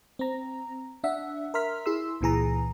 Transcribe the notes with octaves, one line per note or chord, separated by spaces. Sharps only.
C4 A#5
D4 E5 F#5
A#4 E5 C6 F6 B6
E4 G#4 C6 E6
C#2 A#2 E3 G#4 A#5